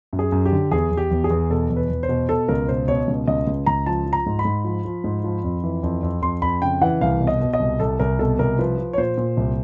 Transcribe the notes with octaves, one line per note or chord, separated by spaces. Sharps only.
F#2
G#4
F#2
G4
D3
E2 G#4
E2
G4
E2
G#4
E2
B2 A4
E2
B4
E2
C5
B2
B2 A4
C#2 A#4
B2 C5
B2 C#5
C#2
C#2 D#5
C#2
C#2 A#5
F3 A5
F3
A#5
G#2
B5
G#2
F3
F3
G#2
F3
F2
E3
F2
F2
F2 C6
F2 B5
C#3 G5
E3 F#5
C2 F5
B2
D#5
B2
D#5
C2
C2 A4
C2 A#4
B2 A4
C2 A#4
F3 B4
F3
C#5
A#2 C5
A#2
C2